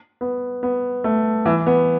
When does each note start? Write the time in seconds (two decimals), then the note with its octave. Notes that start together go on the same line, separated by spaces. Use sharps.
0.21 B3
0.63 B3
1.04 A3
1.45 E3
1.67 B3